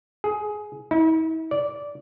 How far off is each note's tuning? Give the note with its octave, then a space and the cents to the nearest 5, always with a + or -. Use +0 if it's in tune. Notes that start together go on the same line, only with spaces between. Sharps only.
G#4 +15
E4 -45
D5 -15